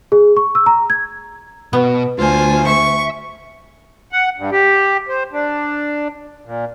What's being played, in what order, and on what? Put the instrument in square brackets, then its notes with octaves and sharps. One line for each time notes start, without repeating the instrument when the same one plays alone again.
[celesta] G#4
C#6
E6
A#5
G#6
[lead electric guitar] B2 [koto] B3
[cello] D2 [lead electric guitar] F4 [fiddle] C5 G#5
[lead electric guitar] E5 [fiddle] C#6
[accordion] F#5
G2
G4
C5
D4
A#2